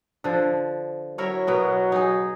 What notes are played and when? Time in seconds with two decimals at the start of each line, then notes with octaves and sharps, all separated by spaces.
0.24 D3 F3
1.18 F#3 E4 A#4 C#5
1.47 B2 B3 A#4
1.92 D#4 G#4